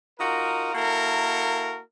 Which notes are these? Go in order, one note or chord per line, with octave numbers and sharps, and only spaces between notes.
D#4 F4 F#4 A#4
A#3 E4 F#4 A4 A#4